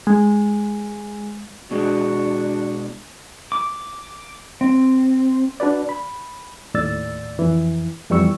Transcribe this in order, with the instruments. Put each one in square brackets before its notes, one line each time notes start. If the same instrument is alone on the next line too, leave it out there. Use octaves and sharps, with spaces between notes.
[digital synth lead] G#3
[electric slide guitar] B2 G#3 [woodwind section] D4 F#4
[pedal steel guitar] D6
C4
[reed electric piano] D4 F#4 B4 D5
B5
D#2 A2 D5 E6 A6
F2 E3
F2 E3 G3 B3 C#6 E6